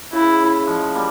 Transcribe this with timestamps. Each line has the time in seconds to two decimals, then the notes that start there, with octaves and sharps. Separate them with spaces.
0.13 C#3 E4
0.40 C#3
0.67 F3 G#3
0.95 G3 A#3